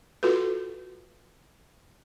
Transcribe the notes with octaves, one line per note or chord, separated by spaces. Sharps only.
F4 F#4 A4 B4